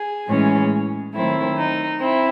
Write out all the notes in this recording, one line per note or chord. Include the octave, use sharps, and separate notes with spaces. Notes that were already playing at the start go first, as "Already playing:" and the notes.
Already playing: G#4
A2 E3 G#3 C#4
D#3 F#3 A3 C4 E4
D#4
C4 E4